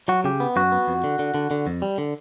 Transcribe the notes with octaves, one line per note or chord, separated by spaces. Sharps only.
F#3 F#4
C#3 G4
B3
F#2 F#4
B3
F2
D3
D3
D3
D3
F2
G3
D3